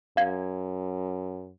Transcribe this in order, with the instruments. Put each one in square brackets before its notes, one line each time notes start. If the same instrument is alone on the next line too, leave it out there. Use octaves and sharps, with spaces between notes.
[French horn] F#2 [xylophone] F5 G#6